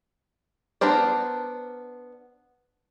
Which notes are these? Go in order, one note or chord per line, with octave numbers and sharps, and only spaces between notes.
B3 D4 A#4 C5 D5